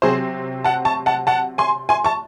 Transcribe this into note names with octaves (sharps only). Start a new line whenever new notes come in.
C3 F#3 C4 G#4 C5
F#5 A5
A5 C#6
F#5 A5
F#5 A5
G#5 C6
G#5 C6
A5 C#6